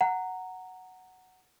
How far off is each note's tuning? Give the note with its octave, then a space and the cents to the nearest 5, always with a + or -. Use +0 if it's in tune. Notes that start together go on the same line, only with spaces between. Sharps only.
F#5 +0 A#5 -10